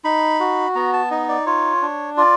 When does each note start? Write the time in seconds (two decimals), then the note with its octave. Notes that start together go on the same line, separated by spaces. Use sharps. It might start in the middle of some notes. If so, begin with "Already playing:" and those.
0.04 D#4 B5
0.40 F#4
0.75 B3 A#5
0.93 A5
1.11 D#4 D#5
1.29 D5
1.46 F4 C#5
1.82 D4
2.17 F4 D5